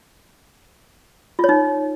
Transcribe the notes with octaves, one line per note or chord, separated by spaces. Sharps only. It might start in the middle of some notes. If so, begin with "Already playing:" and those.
D#4 F4 C#5